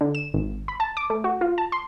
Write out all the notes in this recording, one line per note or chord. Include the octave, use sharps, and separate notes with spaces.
D3
E7
G#1
B5
A5
D6
A3
F#4
F4
A5
C6